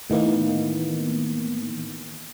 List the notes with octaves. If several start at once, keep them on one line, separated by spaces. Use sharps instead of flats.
A2 D#3 E3 A#3 B3